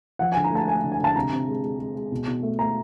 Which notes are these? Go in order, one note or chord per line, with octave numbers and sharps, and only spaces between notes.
F3 F#5
G#5
D3
A#5
A3 A5
A3 G#5
D3
G#5
D3 A5
C3 A#5
C3
G#3
G#3
G#3
G#3
B2
B2
A3
A3 A#5